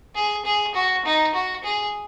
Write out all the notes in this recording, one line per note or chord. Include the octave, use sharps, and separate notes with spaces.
G#4
G#4
F#4
D#4
F#4
G#4